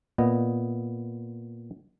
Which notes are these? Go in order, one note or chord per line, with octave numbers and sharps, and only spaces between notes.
A#2 B3 D#5